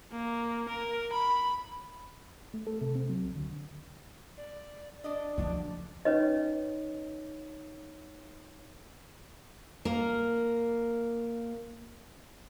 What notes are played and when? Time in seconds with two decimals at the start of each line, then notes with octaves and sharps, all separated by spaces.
0.12 A#3
0.69 A#4
1.13 B5
2.54 A3
2.67 A4
2.81 C3
2.95 C4
3.09 F#3
3.24 C#2
3.36 D3
4.37 D5
5.04 D4 D5 D#5
5.38 B2 D3 F3 D4
6.05 C#4 D#4 B4 C#5 D#5
9.85 A#3 A#4